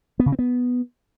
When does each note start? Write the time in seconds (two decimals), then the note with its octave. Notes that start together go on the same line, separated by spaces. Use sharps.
0.19 B3
0.26 C#3
0.32 C4
0.39 B3